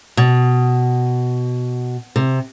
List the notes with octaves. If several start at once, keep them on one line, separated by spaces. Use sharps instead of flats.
B2
C3